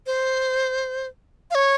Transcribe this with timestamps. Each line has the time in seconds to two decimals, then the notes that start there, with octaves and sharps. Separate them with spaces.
0.06 C5
1.51 F5
1.55 C#5